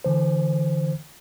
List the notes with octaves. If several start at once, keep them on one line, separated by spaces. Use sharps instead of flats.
D3 E3 C5